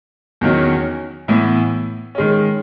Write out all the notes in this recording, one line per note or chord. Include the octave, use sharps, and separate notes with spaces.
E2 D#3 F#3 C#4
A2 E3 B3 E4
D#3 G#3 C#4